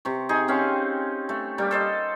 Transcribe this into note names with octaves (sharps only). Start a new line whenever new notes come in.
C3 C#6
D#4 G#4
C4 C#4 F5
A3
G3 A#3
A4 C5 D#5